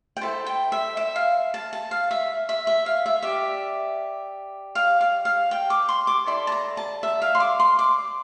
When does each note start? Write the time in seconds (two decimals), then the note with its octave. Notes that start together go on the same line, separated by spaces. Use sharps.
0.17 G5
0.21 E4 A4 C5 A5
0.46 G5
0.72 E5
0.97 E5
1.16 F5
1.54 A5
1.73 A5
1.91 F5
2.11 E5
2.49 E5
2.67 E5
2.86 F5
3.06 E5
3.22 G4 D5 E5
4.75 F5
5.01 F5
5.25 F5
5.51 G5
5.70 D6
5.89 C6
6.07 D6
6.26 E4 A4 D5 C6
6.47 A5
6.52 A#5
6.77 A5
7.03 E5
7.22 F5
7.35 C6
7.40 D6
7.60 C6
7.79 D6